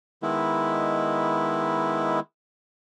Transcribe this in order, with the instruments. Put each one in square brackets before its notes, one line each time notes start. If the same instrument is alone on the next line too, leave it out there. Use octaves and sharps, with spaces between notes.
[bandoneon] D#3 G#3 B3 E4